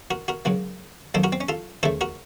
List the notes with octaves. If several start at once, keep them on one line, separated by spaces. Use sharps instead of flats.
F#4 A#4
F#4 A#4
C#2 C#3 F#3 A#3
F#2 D#3 A#3 A4 C5
F#4 A#4
C4
C#4
F4 A4
D#2 C#3 A3 A4 C5
F#4 A#4